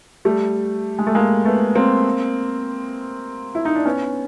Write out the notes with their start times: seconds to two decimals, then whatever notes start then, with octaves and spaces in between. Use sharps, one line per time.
0.25 G3 A3
0.99 G#3
1.07 A3
1.15 G#3 A#3
1.45 A3 B3
1.75 A#3 C4
3.55 E4
3.65 D#4
3.75 D4
3.86 B3 C#4